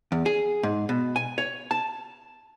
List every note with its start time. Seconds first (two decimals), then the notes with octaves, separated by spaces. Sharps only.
0.12 E2
0.26 G#4
0.63 G#2
0.89 B2
1.16 G#5
1.38 C#5
1.71 A5